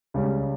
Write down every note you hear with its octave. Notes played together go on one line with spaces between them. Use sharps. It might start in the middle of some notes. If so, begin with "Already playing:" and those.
C#2 C#3 G3 C#4